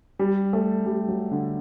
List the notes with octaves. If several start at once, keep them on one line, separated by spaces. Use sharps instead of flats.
G3
A3
G3
F#3
D3